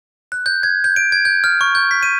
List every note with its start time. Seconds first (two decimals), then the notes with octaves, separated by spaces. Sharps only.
0.32 F#6
0.46 G6
0.63 G#6
0.84 G6
0.96 D7
1.12 G#6
1.25 G6
1.44 F6
1.61 C#6
1.75 G6
1.91 B6
2.03 D#7